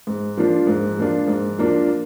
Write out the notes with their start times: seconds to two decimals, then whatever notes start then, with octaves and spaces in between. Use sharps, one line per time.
0.07 G#2
0.37 F3 A#3 D4 F4
0.67 G#2
0.98 F3 A#3 D4 F4
1.28 G#2
1.58 F3 A#3 D4 F4